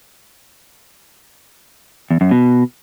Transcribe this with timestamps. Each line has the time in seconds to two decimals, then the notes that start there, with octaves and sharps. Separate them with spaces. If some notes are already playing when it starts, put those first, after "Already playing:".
2.11 E2
2.21 F#2
2.31 B2